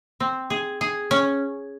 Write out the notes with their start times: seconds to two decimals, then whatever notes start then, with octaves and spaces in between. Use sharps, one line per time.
0.20 C4
0.50 G#4
0.81 G#4
1.11 C#4